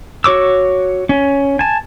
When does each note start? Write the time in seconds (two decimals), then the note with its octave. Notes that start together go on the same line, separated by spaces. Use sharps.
0.24 F#4 C#5 D6 E6
1.09 C#4
1.59 G#5 A5